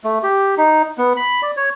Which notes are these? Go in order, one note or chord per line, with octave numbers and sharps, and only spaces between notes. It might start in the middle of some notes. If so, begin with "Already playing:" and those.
A3
G4
D#4
B3
B5
D5
C#5